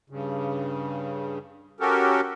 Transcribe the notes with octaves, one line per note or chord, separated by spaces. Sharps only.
G2 C#3
C#4 F#4 G4 A4 A#4